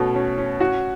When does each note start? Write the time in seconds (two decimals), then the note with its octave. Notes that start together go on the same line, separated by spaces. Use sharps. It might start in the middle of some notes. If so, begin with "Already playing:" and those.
Already playing: B2 A3 C#4
0.15 C#4
0.38 C#4
0.60 F#4